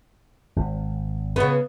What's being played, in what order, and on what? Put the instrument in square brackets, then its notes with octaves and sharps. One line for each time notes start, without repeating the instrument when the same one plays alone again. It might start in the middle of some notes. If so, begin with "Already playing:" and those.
[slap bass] G#1
[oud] C#3 B3